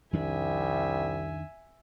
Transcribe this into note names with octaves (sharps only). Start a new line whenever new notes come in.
C2 F2 D#3 D4 E5 G#5